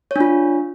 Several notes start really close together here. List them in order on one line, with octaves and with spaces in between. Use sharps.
C#5 D4 F4